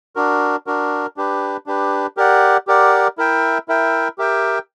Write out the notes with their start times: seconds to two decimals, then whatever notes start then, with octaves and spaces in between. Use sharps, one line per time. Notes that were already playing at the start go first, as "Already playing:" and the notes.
0.16 D4 F#4 A#4
0.67 D4 F#4 A#4
1.17 D4 G4 B4
1.66 D4 G4 B4
2.17 G4 A#4 D5 F#5
2.67 G4 A#4 D5 F#5
3.18 E4 A#4 E5 G5
3.68 E4 A#4 E5 G5
4.18 G4 A#4 E5 G5